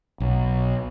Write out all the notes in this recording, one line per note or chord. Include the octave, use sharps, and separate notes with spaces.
B1